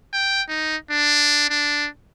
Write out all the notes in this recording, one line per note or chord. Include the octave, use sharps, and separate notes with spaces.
G5
D#4
D4
D4